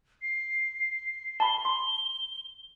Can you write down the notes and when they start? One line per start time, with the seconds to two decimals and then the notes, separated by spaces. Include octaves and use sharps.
0.22 C7
1.40 A5 B5 G7
1.65 C6